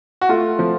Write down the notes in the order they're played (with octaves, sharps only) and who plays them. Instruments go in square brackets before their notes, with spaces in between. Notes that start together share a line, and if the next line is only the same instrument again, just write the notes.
[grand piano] F#4
A3 F4
F3